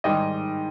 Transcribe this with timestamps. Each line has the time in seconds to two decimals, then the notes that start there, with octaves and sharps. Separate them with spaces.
0.04 G#2 D#3 G3 D#5